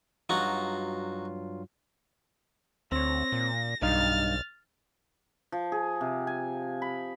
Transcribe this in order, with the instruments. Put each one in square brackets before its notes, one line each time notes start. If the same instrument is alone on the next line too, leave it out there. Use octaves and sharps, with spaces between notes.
[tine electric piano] G2 F#3 F4 [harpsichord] D#4 F#4
[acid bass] D2 [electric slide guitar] C4 C#5 [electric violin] A#6
[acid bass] A#2
[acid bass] B1 [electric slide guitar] G2 D#4 F5 [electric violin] F6 A6
[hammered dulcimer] F3
G#4
C3
G#5
B5